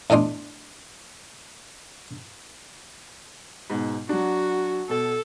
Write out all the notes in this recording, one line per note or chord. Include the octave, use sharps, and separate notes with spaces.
E2 A2 D4 D#4 C6
G#2 B2
F#3 D4 F#4
B2 A4